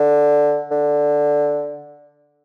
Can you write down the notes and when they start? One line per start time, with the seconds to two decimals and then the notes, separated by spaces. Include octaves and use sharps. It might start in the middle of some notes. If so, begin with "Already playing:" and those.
Already playing: D3
0.71 D3